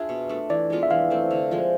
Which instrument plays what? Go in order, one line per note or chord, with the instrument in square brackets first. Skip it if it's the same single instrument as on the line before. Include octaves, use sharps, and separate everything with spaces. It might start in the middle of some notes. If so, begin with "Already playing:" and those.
Already playing: [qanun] D4 F4 G#4 [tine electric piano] E5
[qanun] B2
A3 D4
[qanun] E3 [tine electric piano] D5
[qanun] G#3 B3 F4
[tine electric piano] E5
[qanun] E3 [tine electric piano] F5
[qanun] A3 C4
D3
F3 G#3